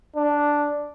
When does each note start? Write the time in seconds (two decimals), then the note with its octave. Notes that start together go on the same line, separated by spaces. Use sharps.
0.16 D4